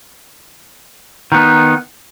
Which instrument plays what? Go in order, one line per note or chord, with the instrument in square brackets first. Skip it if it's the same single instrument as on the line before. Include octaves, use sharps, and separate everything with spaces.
[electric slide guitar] D#3
B3
D#4